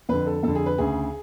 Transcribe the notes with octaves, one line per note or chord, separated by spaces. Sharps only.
F2 D3 B4
A4
F2 D3 A4
G#4
B4
D2 C#3 G#4